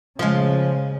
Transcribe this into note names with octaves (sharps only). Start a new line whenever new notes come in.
C#3 F3 G#3